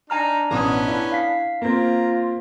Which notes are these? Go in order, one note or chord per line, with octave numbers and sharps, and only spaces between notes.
D4 D#4 G#5 A#5 F6
A1 B2 B3 C#4 D#6
E4
F5 B6
A#3 C4 F4 A#5